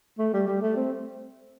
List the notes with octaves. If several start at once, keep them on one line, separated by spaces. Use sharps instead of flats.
A3
G3
G3
A3
C4